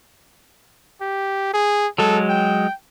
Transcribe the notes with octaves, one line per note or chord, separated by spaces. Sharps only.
G4
G#4
F#3 G#3 A4
G5